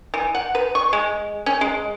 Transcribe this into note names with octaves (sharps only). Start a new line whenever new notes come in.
E3
F#5
B4
C#6
G#3
C#4
G#3